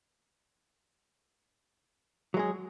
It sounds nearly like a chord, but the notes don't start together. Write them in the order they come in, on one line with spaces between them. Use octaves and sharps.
F#3 G#3 G#4